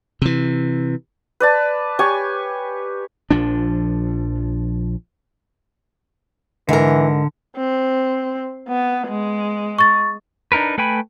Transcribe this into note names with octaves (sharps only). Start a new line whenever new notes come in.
C3 E3
B4 D5 A5
G4 C#5 G#5 C#6
A#1 F3 D4
G#2 D3 E3 A#4
C4
B3
G#3
C#6 A6
D4 D#4 A#4 B4
A3 B4 G5 G#5 B5